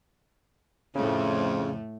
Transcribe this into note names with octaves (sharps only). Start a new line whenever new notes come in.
F2 A2 C#3 A3